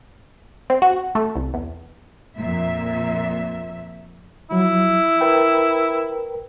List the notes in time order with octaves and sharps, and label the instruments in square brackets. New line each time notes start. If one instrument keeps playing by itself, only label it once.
[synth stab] C4
F#4
A3
C2
E2
[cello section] F2 A#2 E5
[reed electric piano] F3 F#3 [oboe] E4
[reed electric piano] A#4 B4 G5